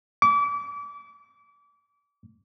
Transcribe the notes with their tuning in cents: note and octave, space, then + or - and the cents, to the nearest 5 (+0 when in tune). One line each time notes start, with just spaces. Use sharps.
D6 -30